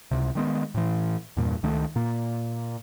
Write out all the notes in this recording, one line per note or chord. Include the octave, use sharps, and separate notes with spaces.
C#2 C3
D#3 G#3 B3
A2 E3
E2 G2 A#2
C#2 D#3 A3
A#2 A#3